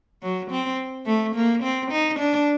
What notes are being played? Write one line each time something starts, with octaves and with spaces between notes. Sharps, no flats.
F#3
C4
A3
A#3
C4
D#4
D4